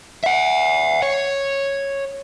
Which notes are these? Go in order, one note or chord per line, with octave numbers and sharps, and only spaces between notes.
E5 F#5
C#5